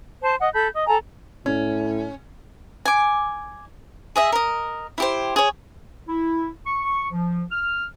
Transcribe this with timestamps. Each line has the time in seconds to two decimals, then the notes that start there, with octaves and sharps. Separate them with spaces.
0.21 C5 A5
0.40 D#5 F#5
0.54 A4 B5 G6
0.72 D#5
0.87 A4 G#5 A#5
1.46 A2 C#4
2.85 G#5 D6
4.16 G#4 D#5 E5
4.32 A#4 D#5
4.98 E4 G4 C5
5.36 G#4 C#5
6.08 E4
6.66 C#6
7.11 F3
7.52 F6